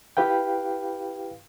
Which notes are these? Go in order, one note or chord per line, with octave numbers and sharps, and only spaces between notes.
E4 G4 B4 F5 G5